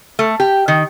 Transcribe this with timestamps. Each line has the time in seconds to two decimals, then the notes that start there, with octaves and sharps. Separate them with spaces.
0.19 A3
0.40 G4
0.68 D#3